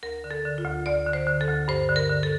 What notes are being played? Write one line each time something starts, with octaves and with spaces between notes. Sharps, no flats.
D2 A#4
D3
A4
D3
F4
D2
D2 D5
D3
C5
D3
A4
D2
G2 C5
D3
A#4
D3
A4